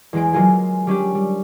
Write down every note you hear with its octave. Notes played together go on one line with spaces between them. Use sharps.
E2 G#3 D7
F#3 G#3 A#3 F4 G#4
G3 C#4 D4 G4
G3